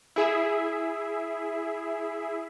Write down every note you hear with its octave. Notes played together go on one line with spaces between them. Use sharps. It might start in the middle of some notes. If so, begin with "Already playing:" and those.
E4 G#4 E5